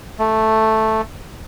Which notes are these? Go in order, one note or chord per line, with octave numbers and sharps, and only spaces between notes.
A3